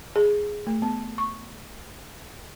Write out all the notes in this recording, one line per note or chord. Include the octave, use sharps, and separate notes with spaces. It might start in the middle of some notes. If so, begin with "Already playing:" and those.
G#4
A3
B3
C#6